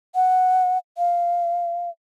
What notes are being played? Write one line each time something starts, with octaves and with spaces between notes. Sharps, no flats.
F#5
F5